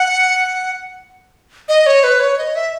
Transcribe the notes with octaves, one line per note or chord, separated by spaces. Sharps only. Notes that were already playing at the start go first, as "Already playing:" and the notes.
Already playing: F#5
D#5
C#5
B4
C#5
D#5
E5